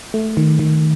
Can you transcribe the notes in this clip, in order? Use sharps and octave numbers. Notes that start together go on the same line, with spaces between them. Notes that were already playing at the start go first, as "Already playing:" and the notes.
A3
D#3
D#3